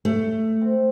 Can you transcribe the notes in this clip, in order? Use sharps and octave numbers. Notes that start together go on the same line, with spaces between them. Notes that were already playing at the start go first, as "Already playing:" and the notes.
A3
C4